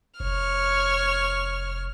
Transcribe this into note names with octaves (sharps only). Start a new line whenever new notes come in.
F1 C#5 F6